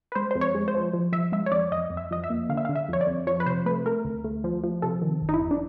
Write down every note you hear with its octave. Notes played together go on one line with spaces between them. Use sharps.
B4
G#3 C5
F2 C5
C#5
G#3
C5
F3
F3
F3 E5
G#3 E5
C#5
F2 D5
F2 D#5
F2
E5
F3 D#5
E5
A#3
D3 F5
E5
F5
D3
E5
F2 C#5
D5
F2
F3 C#5
B4
C3 C5
A3 B4
A3 A#4
D2
A3
F3
F3
C3 A4
D#3
G1
D#4
E4
F2
D4